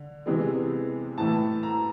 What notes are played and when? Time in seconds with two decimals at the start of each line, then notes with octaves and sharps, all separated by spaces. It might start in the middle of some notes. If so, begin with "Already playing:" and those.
Already playing: D3
0.26 C3 E3 G#3 B3
1.18 A2 E3 A3 A5
1.63 A#5